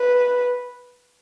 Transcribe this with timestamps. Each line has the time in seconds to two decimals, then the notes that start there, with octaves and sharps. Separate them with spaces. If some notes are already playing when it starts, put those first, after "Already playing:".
Already playing: B4